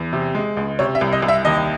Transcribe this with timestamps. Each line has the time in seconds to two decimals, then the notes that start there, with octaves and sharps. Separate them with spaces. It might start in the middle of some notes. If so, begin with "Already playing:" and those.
Already playing: E2
0.13 C3
0.35 G#3
0.57 C#2
0.79 C3 C#5
0.95 E5
1.01 C2
1.13 D#5
1.22 C2
1.28 E5
1.45 D#2 D#5